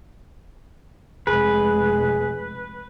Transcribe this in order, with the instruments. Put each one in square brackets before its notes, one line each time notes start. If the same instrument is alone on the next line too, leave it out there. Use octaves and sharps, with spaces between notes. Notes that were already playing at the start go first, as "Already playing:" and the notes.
[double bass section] F1 G#3 [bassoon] G#4 [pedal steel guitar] B4